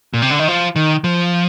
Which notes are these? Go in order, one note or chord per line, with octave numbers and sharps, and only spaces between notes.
A#2
C3
D3
D#3
F3
D#3
F3